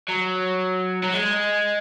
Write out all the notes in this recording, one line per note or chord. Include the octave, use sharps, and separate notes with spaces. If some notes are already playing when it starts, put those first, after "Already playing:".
F#3
F#3
G#3